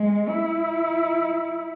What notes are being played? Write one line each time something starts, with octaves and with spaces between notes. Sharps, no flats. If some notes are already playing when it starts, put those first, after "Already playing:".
Already playing: G#3
E4